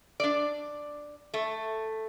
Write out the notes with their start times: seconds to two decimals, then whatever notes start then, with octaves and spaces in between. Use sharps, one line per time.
0.20 D4 D5
1.34 A3